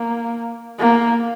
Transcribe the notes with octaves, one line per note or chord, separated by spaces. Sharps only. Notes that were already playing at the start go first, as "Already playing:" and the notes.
Already playing: A#3
A#3